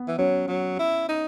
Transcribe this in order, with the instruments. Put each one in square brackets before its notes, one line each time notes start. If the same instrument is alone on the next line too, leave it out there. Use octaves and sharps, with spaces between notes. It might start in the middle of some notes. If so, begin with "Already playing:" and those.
Already playing: [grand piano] B3
[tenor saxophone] E3
[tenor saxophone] F#3 [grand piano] C#4
[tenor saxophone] F#3
E4
D#4